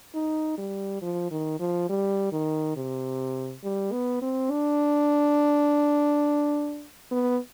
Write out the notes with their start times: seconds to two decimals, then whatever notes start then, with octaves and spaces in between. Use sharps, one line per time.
0.14 D#4
0.58 G3
1.02 F3
1.31 D#3
1.60 F3
1.90 G3
2.32 D#3
2.76 C3
3.64 G3
3.92 B3
4.22 C4
4.51 D4
7.11 B3